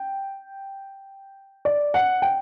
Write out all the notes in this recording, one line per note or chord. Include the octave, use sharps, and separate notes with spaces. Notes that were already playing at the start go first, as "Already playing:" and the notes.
Already playing: G5
D5
F#5
G5